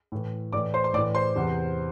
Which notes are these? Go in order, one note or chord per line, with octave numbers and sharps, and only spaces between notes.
A2 E3
A2 E3 D5 D6
C5 C6
C6
A2 E3 D5 D6
C5 C6
E2 C3 E3